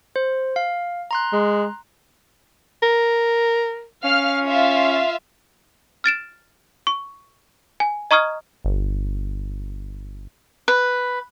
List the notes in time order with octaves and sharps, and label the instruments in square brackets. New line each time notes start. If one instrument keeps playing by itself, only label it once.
[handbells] C5
F5
A#5 C6 F#6
[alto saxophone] G#3
[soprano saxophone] A#4
[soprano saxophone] C#4 [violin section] F5 F6
[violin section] F4 E5 F5
[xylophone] F6 A6 D7 E7
C#6
G#5
D#5 A#5 C#6 D#6 F6 G#6
[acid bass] G1
[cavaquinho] B4